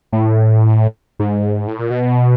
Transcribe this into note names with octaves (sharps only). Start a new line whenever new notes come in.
A2
G#2
A2
A#2
B2